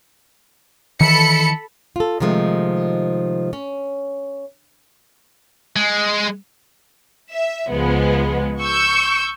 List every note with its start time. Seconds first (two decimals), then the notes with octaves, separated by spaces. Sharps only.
1.01 D#3 E3 A4 B5 C#7
1.96 F4 A4
2.20 C3 D#3 F3 G#3 A3
3.53 C#4
5.76 G#3
7.32 E5
7.69 C#2 F3 G#3 B3
8.60 C#6 E6 G6